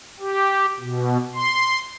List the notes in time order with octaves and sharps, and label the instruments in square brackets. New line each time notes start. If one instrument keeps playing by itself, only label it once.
[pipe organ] G4
B2
C6